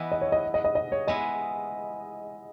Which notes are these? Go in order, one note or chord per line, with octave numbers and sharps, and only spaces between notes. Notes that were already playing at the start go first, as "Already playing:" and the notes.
Already playing: E3 B3 E4 D#5
D#5
C#5
D#5
D#5
D#5
D#5
C#5
G#3 B3 E4 D#5